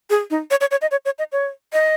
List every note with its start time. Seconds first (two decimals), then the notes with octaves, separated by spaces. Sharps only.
0.10 G#4
0.30 D#4
0.51 C#5
0.61 C#5
0.71 C#5
0.82 D#5
0.91 C#5
1.05 C#5
1.19 D#5
1.32 C#5
1.73 D#5